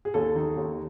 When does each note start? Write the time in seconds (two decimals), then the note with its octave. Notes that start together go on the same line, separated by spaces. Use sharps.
0.05 G#4
0.14 D#2 A4
0.36 D#3 D#4
0.57 D#2